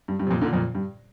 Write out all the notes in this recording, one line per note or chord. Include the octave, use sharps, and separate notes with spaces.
G2
G2
C3
F2 A#2
A#2 D3
F2 A#2
G2